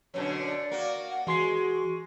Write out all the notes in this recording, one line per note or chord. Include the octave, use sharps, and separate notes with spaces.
F#2 B2 D3 C#5
D5
A#3 F#4
F#5
E3 G#3 F#4 C6 C7